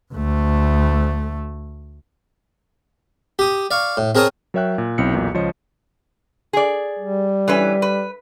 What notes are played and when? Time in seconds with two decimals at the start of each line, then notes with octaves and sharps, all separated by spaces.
0.14 D2 A3
3.39 G4 D#6
3.71 D5 F5 C#6
3.97 A2
4.15 C4 G#4 A#4 C#5 A5 D#6
4.54 F#3 A#4 C#5 E5 G5 F#6
4.78 A#2
4.98 B1 C4 E4 C#7
5.14 B1 E2 A#2
5.34 C#2 F3 C5 C#5 D#5 C#7
6.53 G#4 D5
6.99 G3
7.48 E3 C#4 B4
7.82 B4